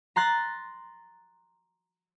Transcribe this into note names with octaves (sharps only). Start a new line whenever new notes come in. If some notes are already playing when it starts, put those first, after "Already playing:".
A#5 C6 F#6 A6 A#6